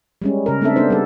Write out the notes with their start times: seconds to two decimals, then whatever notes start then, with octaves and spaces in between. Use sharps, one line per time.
0.22 G3 G#3 C#4
0.46 C#3 A#4
0.61 A3 C4 D4 A4 E5
0.76 A#3 B3 D4 D#4 C5
0.90 G3 A4